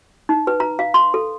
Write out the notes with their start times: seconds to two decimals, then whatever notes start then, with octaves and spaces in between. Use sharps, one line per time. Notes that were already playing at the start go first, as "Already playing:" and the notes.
0.29 D#4
0.47 B4
0.60 A#5
0.79 F5
0.94 C6
1.14 A4